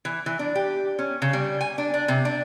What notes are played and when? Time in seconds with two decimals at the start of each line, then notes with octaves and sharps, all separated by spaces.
0.05 E3
0.26 E3
0.39 D4
0.55 G4
0.99 C#4
1.22 C#3
1.33 G3
1.61 G#5
1.78 D4
1.94 D4
2.08 C3
2.25 D4